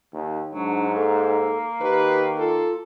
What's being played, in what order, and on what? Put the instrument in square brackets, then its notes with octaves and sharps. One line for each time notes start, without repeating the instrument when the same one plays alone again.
[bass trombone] D#2
[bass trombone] G#2 [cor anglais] F#3 [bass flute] D4
[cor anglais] A#3 [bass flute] A4
[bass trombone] D#3 [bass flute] G4 [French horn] B4
[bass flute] F4 [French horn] A4